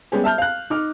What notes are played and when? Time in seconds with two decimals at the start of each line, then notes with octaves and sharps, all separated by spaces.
0.12 G3 G#3 B3 C#4 G4 G#4
0.24 E5 A5 F6 G6
0.38 F5 F#6
0.70 D#4 D6 F6